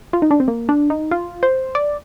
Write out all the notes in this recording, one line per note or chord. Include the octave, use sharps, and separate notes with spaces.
F4
D#4
D4
C4
A#3
D4
D#4
F4
C5
D5